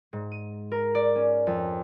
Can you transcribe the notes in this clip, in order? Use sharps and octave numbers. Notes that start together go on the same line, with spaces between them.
G#2
D#7
A#4
D5
C#4
F2